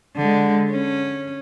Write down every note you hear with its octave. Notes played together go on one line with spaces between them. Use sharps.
D3 G#3
C#4